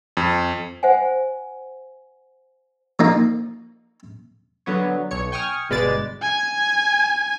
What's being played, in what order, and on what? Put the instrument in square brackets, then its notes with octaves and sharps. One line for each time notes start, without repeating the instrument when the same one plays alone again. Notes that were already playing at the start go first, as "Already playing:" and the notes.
[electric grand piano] F2
[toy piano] C5 E5 F#5 G#5
[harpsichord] F3 A#3 D#4
[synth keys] D3 F#3 B3 C#5
B1 C#5 C#7
G5 G#5 C#6 D#6 F6
G1 B2 G#3 B4 D5 A6
[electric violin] G#5